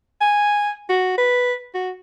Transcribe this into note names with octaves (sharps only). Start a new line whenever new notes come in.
G#5
F#4
B4
F#4